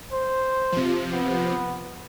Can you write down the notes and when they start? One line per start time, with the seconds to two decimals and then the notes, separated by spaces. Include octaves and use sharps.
0.12 C5
0.72 C3 F3
1.12 B3